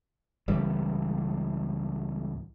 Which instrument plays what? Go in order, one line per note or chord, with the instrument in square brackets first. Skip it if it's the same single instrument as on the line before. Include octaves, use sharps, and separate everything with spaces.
[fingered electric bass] C#2 A2 E3 G3